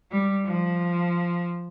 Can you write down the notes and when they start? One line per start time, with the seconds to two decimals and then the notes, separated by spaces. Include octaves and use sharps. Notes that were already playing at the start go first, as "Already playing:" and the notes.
0.12 G3
0.45 F3